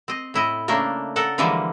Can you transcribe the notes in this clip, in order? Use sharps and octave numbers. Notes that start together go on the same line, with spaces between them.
C4 D#5
A2 E4 D#5
C#3 A3 A#3 D4 A#4
A4 A#4 F#5
D3 E3 F3 G3 G#3 A#3